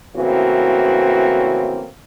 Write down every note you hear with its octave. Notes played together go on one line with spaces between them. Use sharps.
A2 C#3 E3 A#3 C4 F#4